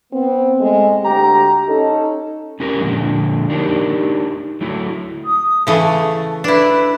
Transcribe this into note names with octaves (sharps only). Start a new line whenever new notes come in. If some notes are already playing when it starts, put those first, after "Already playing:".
B3 C4
A2 G#3
D2 G4 A#5
C#4 D#4 A4
C4 C#4 E4 G4 A#4
A#2 D3 F3 G#3
D4 D#4 G4 A#4
F#3 A3 E4
D#6
C#3 E3 A3 A5
D4 E4 B4